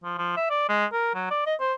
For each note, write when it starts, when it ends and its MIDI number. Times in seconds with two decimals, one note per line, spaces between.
0.04 0.16 53
0.18 0.35 53
0.37 0.47 76
0.50 0.68 74
0.69 0.86 56
0.93 1.13 70
1.14 1.27 54
1.31 1.46 74
1.46 1.55 75
1.60 1.73 72